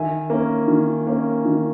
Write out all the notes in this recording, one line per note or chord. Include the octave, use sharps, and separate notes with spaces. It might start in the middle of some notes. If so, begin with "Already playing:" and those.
Already playing: D#3 E5 G#5
A#3 C#4
D#3
A#3 C#4
D#3